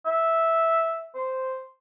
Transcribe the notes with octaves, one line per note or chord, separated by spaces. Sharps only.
E5
C5